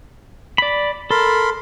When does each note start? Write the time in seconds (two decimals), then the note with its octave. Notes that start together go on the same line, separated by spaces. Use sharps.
0.58 D5 B5
1.11 A4 A#4 B5 C6